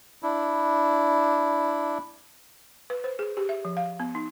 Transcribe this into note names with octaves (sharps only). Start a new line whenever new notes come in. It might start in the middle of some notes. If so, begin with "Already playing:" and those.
D4 E4
B4
C5
G#4
G4
E5
F3
F5
B3
D#4